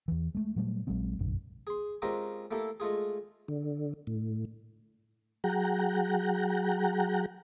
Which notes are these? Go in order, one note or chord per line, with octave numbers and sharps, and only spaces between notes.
E2 E3
G#3 A3
A#2 F#3 G3 A3
A#1 F#3 G#3 C4
F1 A#1 F#2 D3
G#4 C6
G#3 C4 C#4 F4 G4 A#4
A3 A#3 E4 G4 A4
G#3 A3 F4 G#4
D3
A2
F#3 G#4 F#5 G5 A#5